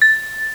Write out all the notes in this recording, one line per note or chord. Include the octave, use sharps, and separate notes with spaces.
A6